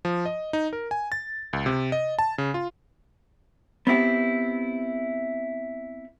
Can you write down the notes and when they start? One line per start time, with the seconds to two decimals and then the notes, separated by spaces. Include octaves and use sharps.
0.05 F3
0.25 D#5
0.53 D#4
0.73 A#4
0.91 G#5
1.12 A6
1.53 C#2
1.66 C3
1.92 D#5
2.19 A5
2.38 C#3
2.54 F4
3.87 B3 C4 E4 G4